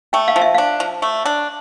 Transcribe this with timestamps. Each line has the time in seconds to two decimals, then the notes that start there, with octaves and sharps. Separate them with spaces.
0.13 A3 G5
0.28 F5
0.36 F3
0.42 E5
0.55 D4 F5
0.80 F3
1.02 A3
1.26 D4